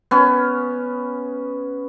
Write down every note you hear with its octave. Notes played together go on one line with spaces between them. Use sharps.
B3 C#4